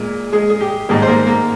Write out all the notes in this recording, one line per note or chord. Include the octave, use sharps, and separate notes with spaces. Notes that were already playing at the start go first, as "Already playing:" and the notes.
Already playing: A#2 G#3
G#3 G#4
G#4
G4
G#2 D#3 G3 G#3 A#3 G#4
C5
A#3 A#4
A#3 A#4